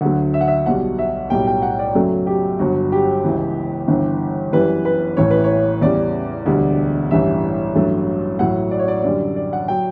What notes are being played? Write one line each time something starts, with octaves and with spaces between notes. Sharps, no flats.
D2 D3 F#3 A3 F#5
E5
F#5
E5
B1 B2 G3 F#5
E5
B1 A2 G3 G5
G5
F#5
D5
F#2 C#3 F#3 A3 A4
G4
G1 G2 F#3 F#4
G4
C#2 C#3 E3
G1 G2 E3
F#2 E3 G3 B4
B4
A1 A2 E3 C#5
B4
C#5
E2 C#3 G3 D5
E1 D2 D3 G3
A1 G2 E3 G3 E5
A1 G2 F#3 A3
A1 A2 F#3 F#5
D5
C#5
D5
F#2 D3 G3 D5
D5
F#5
F#3 G5